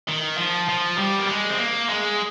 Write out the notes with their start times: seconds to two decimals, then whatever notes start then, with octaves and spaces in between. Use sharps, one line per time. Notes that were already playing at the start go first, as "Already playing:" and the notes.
0.09 D#3
0.38 F3
0.69 F3
0.98 G3
1.19 A#3
1.28 G#3
1.50 C4
1.59 A#3
1.89 G#3